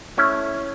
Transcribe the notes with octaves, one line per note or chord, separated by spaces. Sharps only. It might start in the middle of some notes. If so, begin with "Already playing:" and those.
A3 C#4 E4